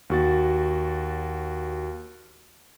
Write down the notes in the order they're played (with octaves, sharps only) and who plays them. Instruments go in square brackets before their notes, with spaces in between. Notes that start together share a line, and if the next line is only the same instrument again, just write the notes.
[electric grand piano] D#2 F#4 A6